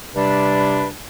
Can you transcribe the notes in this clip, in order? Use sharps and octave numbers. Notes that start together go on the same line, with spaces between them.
C3 G3 D4 B4